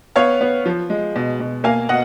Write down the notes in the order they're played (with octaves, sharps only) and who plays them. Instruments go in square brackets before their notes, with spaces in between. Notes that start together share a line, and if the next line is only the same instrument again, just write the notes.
[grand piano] B3 C#5 F5
B3
F3
G#3
B2
B2
A#3 F5 G#5
B2 D#5 F#5